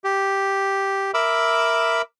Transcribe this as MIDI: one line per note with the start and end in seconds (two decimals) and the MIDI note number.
0.04 1.11 67
1.14 2.02 70
1.14 2.02 76
1.14 2.02 83
1.14 2.02 86
1.14 2.02 88